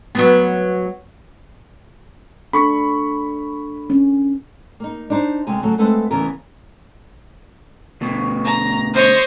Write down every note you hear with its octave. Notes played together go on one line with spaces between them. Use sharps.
F#3 B3
D4 A4 B5 C#6 B6
C#4
A#3 D#4
D4 D#4 C5
D2 C3 G#3 G#5
C#3 F#3 A3
G#3 A3 C4 A4 B4 F#5
D2 C#3 E3 A#3 B3 A#4
D2 B2
A#5
C5 C#5 D#5